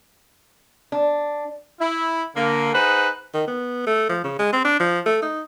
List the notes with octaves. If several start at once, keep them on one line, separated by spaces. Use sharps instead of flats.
D4
E4
D3 A#3
D#4 G#4 B4 C5 F#5
D#3
B3
A3
F3
C#3
G#3
C4
D4
F3
A3
D#4